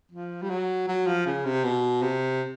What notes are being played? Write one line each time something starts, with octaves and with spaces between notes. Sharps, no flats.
F3
G3
F#3
F#3
F3
C#3
C3
B2
C3